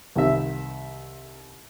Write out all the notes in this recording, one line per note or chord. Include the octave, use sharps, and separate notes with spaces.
C2 D#3 E5